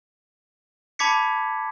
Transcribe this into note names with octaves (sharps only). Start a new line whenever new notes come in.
A5 B5 D6 G#6 B6 C#7